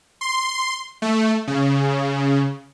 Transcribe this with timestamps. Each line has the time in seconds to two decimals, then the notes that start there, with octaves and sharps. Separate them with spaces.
0.21 C6
1.02 A3
1.47 C#3